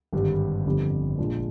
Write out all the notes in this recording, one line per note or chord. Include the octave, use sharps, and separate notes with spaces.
G#1 G2 D3 G3
G1 F2 D3 G3
A#1 A#2 G#3 D4 F4